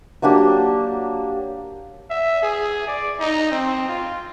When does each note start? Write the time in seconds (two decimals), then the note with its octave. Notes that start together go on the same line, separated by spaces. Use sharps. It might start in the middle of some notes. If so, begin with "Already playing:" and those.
0.22 F#3 A#3 D4 G4
2.10 E5
2.43 G#4
2.87 D5
3.20 D#4
3.51 C4
3.88 F4